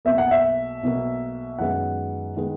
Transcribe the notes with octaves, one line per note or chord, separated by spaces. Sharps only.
B1 B2 A#3 E5
F#5
E5
B1 B2 A#3
F#2 D#3 G#3 B3 F#5
D#3 G#3 B3